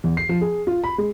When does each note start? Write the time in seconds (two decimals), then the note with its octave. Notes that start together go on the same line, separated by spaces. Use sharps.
0.04 E2
0.17 C7
0.29 F3
0.41 G#4
0.67 F4
0.84 B5
0.98 G#3